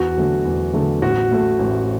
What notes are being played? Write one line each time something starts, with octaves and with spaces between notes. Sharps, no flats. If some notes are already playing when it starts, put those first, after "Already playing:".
Already playing: E2 F#4
D3 F#3 A3
E2
D3 F#3 A3
A1 F#4
A2 A3
A1